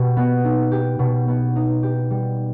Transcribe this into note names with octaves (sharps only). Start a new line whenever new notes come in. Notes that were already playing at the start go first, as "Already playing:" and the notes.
Already playing: B2 G4
B3
D#4
G4
B2
B3
D#4
G4
G3